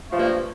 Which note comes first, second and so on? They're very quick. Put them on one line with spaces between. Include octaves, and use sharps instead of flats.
A3 F3 G2 A#3